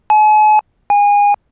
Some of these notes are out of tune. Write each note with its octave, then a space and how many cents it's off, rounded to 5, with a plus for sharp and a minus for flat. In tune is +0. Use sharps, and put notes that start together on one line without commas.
G#5 +45
G#5 -25